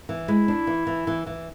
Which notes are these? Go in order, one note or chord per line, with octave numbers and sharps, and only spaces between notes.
E3
G#3 E4
D4
E3
E3
E3
E3